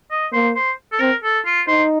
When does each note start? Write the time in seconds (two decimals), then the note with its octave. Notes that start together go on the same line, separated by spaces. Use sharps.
0.11 D#5
0.33 A#3 C5
0.55 C5
0.92 A4
1.00 C4 A#4
1.23 A4
1.46 F4
1.67 D#4 C5